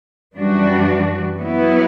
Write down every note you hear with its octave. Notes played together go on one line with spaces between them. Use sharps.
F#2 E3 G3 D4 F#4
F#3 B3 E4